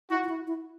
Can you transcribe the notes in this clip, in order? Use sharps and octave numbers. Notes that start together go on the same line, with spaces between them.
E4 F#4
F4
E4
E4